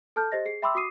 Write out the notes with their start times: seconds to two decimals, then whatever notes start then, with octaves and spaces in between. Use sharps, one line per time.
0.16 A4 A5 F6 G6
0.32 G4 C5 D#5 A#6
0.45 G#4 C7
0.62 E5 G5 B5 C6 D6 E6
0.75 F#4 D6 D#6 C7 D#7